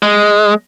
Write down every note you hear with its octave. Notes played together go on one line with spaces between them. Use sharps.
G#3